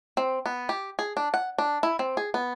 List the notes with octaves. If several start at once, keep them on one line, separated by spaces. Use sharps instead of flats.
C4
B3
G4
G#4
D4
F#5
D4
E4
C4
G#4
B3